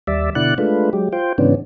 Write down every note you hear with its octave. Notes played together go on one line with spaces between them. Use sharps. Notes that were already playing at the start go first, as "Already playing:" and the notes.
D#2 G3 D5 E5
B2 D3 E4 D5 F#5 F#6
G#3 A3 D4 F4 B4
F#3 G#3 G4
F4 C5 G5
G#2 C#3 E3 B3 C#4 D4